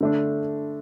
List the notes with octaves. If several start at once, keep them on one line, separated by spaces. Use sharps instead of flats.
D3 A3 D4